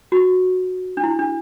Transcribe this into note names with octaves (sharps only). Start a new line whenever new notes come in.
F#4
D4
E4
D4